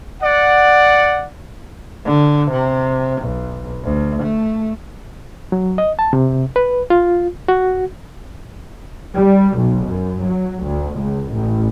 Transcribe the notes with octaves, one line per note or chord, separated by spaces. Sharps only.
D5 F#5
D3
C3
B1
D2
A3
F#3
D#5
A5
C3
B4
F4
F#4
G3
B1
F#2
F#3
D2
C#2
A1